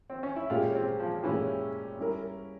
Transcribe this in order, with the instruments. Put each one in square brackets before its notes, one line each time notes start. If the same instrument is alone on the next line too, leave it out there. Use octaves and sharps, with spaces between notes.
[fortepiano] C4
C#4
E4
[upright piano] A#2 G#3 C#4 G4 [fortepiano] F4
[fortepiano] C4
F3
[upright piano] A#2 G#3 C#4 G4 [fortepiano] E3
[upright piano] G3 C#4 E4 A#4